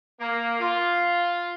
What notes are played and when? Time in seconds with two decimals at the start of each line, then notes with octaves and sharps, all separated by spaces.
0.20 A#3
0.60 F4